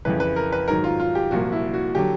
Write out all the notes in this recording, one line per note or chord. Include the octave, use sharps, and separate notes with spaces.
F2 C#3 E3 B4
B4
A#4
B4
G#2 D#3 F#3 A#4
F4
F4
G4
C2 A#2 F3 F#4
E4
F#4
D3 F#3 G4